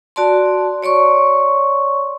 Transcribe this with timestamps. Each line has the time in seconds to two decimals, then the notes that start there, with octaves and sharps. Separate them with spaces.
0.16 F#4 D5 A5 C6
0.83 C#5 D5 C6 C#6